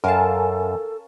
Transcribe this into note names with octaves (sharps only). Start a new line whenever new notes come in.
F#2 C#4 A4 A#4 F5 G#5 A5